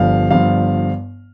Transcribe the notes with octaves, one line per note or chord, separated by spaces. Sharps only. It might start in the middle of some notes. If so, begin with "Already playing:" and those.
Already playing: G1 G2 F3 F5
G1 G2 F3 F5